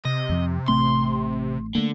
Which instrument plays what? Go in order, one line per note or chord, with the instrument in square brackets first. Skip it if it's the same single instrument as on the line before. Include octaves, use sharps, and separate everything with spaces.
[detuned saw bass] C3 [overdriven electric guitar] D#5
[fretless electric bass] F2 F3
[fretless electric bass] A1 A3 C4 [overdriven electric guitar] C6
[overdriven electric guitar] D3 [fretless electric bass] A3 A#3